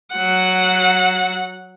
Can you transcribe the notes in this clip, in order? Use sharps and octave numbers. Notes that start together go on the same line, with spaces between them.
F#3 F#5